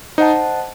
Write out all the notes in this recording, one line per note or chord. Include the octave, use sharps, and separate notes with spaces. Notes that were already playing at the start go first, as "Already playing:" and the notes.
D#4 C5 D#5 F#5 A5